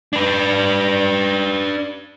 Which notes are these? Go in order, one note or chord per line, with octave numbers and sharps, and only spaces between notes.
D4 B4